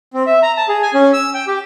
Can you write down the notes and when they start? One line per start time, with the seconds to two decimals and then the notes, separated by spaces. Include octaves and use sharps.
0.14 C4
0.27 E5
0.42 A#5
0.57 A5
0.68 G#4
0.82 G#5
0.94 C#4
1.13 E6
1.34 G5
1.47 G4